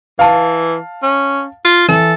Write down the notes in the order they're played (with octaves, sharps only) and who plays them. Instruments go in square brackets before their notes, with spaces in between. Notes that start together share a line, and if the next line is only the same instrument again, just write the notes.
[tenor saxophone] E3 [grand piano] F5 A5
[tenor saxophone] C#4
F4
[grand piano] E3 [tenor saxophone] A4